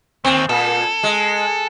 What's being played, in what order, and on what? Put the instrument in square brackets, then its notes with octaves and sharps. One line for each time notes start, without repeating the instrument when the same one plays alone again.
[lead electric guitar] D#2 [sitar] C4
[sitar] A#2 [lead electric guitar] A4
[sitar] G#3